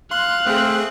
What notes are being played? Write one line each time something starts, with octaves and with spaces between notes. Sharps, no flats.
F5 C6 F#6
A3 C4 G#4